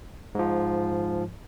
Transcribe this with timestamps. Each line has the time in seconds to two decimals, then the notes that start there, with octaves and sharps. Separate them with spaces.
0.35 G#2 F3